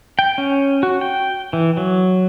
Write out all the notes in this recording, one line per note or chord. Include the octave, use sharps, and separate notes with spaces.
G5
C#4
F#4
G5
E3
F#3